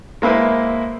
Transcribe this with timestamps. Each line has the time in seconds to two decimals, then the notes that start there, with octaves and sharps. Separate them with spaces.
0.22 G#3 A#3 E4 B4 C5